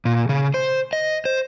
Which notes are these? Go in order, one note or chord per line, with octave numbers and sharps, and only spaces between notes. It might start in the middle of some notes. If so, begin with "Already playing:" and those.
A#2
C#3
C5
D#5
C5